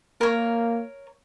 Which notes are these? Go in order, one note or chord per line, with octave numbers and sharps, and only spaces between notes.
A#3 A#4 C#5